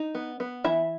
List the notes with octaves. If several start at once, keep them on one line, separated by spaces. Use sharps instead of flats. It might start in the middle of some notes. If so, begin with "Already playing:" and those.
Already playing: D#4
B3
B3
E3 E4 E5